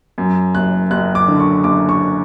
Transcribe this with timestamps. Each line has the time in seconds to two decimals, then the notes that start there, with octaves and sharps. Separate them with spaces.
0.18 F#2
0.55 F#1 F#6
0.91 F#1 F#6
1.15 D6
1.28 D3
1.40 C#6
1.64 F#1 D6
1.89 C#6